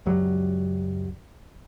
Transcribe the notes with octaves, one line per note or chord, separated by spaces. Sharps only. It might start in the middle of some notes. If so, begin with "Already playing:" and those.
C#2 F#2 F#3 G3